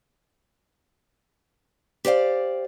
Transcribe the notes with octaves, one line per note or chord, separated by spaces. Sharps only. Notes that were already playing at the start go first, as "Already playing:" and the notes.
G4 C5 D5 F5